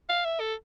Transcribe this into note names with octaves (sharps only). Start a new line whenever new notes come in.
F5
E5
A4